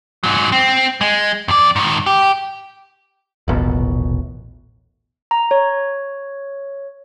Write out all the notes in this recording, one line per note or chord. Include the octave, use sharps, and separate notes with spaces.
G#2 F#3
C4
G#3
F2 D5
G#2 D#3
G4
D#1 A1 B2
A#5
C#5